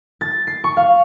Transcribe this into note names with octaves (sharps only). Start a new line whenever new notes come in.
A6
C7
C#6
F5